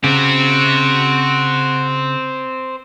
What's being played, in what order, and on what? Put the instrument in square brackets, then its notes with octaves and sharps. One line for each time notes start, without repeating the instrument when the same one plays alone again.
[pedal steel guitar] C#3 [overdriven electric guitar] C4 G4 [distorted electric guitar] F#4